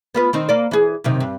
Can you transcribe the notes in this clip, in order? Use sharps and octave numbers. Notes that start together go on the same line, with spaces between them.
B3 F4 B4
D#3 C4 D#4
A#3 D5
E3 G#4
F#2 C3 D#3
G2